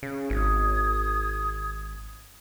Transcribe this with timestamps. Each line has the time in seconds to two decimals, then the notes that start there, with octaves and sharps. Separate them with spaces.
0.03 C#3
0.30 G#1 D#6 G#6